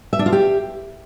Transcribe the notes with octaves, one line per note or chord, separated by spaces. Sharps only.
E5
D4
F4
G4